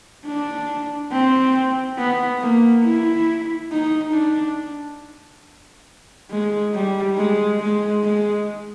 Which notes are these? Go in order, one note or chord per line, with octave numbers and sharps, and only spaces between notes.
D4
C4
B3
A#3
E4
D#4
D4
G#3
G3
G#3
G#3
G#3